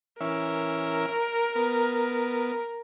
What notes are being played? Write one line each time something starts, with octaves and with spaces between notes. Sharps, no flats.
E3 C#4 A#4 E5
B3